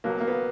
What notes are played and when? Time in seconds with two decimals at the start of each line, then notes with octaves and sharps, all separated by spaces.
0.04 C#2 B2 F#3 A#3
0.20 A#3
0.28 B3